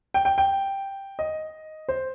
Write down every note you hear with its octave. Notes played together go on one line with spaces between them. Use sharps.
G5
G5
G5
D#5
C5